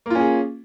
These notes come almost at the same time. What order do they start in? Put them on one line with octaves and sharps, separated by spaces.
A#3 F4 C#4 G#4